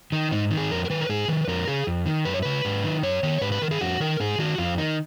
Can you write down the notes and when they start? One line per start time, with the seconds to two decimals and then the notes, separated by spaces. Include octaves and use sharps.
0.12 D#3 D#4
0.31 G#2 D#4
0.51 D#3
0.58 G#4
0.71 F2 A#4
0.85 A#4
0.90 D#3 B4
1.01 A#4
1.09 G#2 G#4
1.28 D#3 B4
1.48 F2 A#4
1.68 C#3 G#4
1.87 F2
2.06 D#3
2.25 F#2 B4
2.34 C#5
2.42 C#3 B4
2.65 G#2
2.84 D#3
3.03 F#2 C#5
3.23 D#3 C#5
3.41 G#2 B4
3.52 B4
3.62 D#3 A#4
3.71 G#4
3.81 F2 F#4
4.00 D#3 A#4
4.20 G#2 G#4
4.38 D#3 F#4
4.58 F2 F4
4.78 D#3 D#4